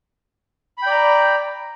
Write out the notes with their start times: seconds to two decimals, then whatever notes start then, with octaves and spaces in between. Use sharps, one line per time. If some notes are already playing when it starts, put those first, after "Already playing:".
0.78 B5
0.82 G5
0.86 D5
0.91 A#5